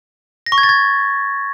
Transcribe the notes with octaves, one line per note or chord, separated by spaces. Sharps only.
A#6
C#6
G#6
A6
G#6